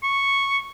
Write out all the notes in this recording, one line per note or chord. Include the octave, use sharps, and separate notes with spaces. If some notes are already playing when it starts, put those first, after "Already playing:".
C#6